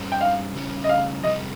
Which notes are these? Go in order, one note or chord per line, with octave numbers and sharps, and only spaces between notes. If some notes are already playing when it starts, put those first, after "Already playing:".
Already playing: G2 G3 C#4 C5
G5
F5
C#3 G3 C#4 G4 C#5
D#5
F5
F2 C3 G3 D#5